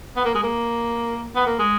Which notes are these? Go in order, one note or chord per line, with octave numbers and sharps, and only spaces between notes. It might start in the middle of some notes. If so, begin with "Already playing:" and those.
B3
A#3
G#3
A#3
B3
A#3
G#3